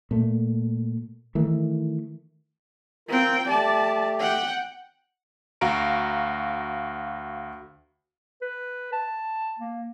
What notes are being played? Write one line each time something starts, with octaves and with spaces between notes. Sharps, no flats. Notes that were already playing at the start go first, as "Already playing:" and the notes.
A#2 A3
D#3 E3 A3
C4 F4 A#4 G5
A3 G4 D5 A5
F#5 G5
D2 F#4 F5 A#5 D7
B4
A5
A#3